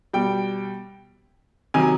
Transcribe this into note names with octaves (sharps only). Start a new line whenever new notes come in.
B2 G3 G5
C3 D#3 F#3 G#5